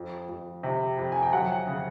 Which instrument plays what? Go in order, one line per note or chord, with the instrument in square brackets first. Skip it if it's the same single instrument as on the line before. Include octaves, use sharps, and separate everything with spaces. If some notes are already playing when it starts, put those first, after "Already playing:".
Already playing: [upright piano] F2
F2
C3
F2
G#5
G5
F#3 F#5
C#3